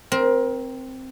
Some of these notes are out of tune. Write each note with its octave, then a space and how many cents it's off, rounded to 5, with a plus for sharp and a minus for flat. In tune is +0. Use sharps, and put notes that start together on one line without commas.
C4 +0 A#4 +25